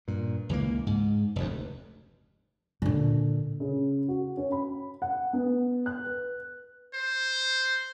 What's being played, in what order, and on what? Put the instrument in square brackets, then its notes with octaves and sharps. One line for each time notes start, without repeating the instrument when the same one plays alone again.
[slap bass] G2 A#2
C#2 E3 F3 A#3
G#2
F1 D2
[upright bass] A#2 D3
[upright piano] C#3
F#4
C#4
B5
F#5
B3
F#6
B4
[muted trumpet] C5